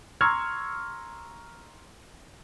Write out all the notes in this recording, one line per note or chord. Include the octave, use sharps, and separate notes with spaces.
A#5 C6 C#6 E6 F6 G#6